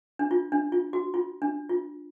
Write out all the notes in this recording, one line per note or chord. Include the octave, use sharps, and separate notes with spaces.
D4
F4
D4
F4
F#4
F4
D4
F4